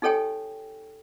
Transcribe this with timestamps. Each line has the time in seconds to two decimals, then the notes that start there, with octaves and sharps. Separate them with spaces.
0.02 D#4 G4 A4 C#5 G5 G#5